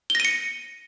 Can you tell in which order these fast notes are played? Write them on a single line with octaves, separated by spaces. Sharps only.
G7 A#6 D#7 C#7